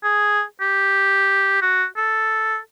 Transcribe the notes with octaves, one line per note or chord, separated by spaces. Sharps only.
G#4
G4
F#4
A4